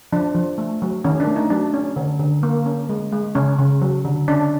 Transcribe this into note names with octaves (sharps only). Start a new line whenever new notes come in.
F3 D4
F3
A3
F#3
D#3 C#4
D4
A3
D#4
F#3 D4
C#4
D3
D3
A#3
C#4
G#3
G#3
C#3 C#4
C#3
F#3
D3
C#4 D4